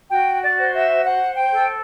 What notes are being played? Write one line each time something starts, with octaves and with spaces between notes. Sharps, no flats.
F#4 G5
D5
C5
E5
C5 F#5
G5
A4